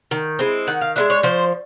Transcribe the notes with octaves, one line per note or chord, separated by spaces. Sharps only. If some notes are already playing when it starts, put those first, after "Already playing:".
D#3
G#3 C4 E4
D#3 F#5
F5
G#3 B3 D4 E5
C#5
F3 C5